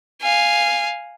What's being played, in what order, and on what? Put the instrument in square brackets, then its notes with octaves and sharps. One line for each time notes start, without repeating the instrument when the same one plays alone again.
[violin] F5 G#5